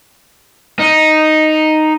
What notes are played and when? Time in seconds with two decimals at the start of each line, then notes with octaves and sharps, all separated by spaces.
0.79 D#4